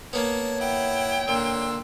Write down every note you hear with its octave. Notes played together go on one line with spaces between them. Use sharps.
A#3 B3 C#5 A5
E4 F#5 G5
A#2 D3 C6 E6